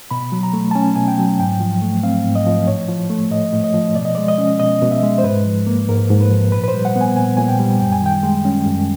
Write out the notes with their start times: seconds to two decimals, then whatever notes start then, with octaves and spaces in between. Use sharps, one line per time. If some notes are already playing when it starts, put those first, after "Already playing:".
0.11 B2 B5
0.32 F#3
0.43 A#5
0.53 A3
0.71 A5
0.75 C#4 G#5
0.96 B2 G#5
1.08 G5
1.19 F#3
1.39 G#2 G5
1.60 F3
1.82 A3
2.03 C4 F5
2.25 G#2
2.35 D#5
2.46 F3
2.67 A2 C#5
2.89 F3
3.10 A3
3.31 A2 D#5
3.53 A2
3.64 D#5
3.74 F3
3.95 B2 D5
4.05 D#5
4.15 G#3 D5
4.28 D#5
4.38 C#4
4.60 B2 D#5
4.82 B2
4.91 E5
5.03 G#3
5.18 C5
5.23 G#2 B4
5.45 F3
5.67 A#3
5.89 G#2 A#4
6.10 G#2
6.21 B4
6.31 F3
6.52 A#2 B4
6.64 B4
6.68 C5
6.74 G3
6.85 F#5
6.96 B3
7.01 G#5
7.16 A#2 G#5
7.37 A#2 G#5
7.48 G5
7.59 G3
7.80 F#2 G5
7.92 G#5
8.02 D#3 G5
8.23 G#3
8.45 C#4
8.66 F#2